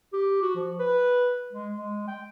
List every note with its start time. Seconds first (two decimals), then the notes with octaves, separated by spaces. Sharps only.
0.13 G4
0.42 F#4
0.56 F3
0.79 B4
1.53 G#3
1.76 G#3
2.08 G5